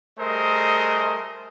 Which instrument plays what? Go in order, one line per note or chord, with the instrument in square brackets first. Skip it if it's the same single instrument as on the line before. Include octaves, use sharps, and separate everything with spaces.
[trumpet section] G3 A3 G#4 A#4 C5 D#5